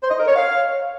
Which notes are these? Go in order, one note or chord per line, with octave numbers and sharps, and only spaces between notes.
C5
D#5
A#4
C#5
F5